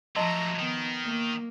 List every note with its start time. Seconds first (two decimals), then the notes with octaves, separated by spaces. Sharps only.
0.16 A2 F3 F#3 D#5 A5 A#5 C6 A#6
0.59 D#3 B3
1.02 A#3